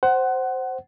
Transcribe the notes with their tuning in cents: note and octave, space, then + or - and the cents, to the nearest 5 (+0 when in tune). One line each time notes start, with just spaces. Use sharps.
C5 +0 F#5 +20